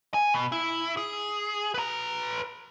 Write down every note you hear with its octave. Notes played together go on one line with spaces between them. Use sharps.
G#5
B2
E4
G#4
B4 A#5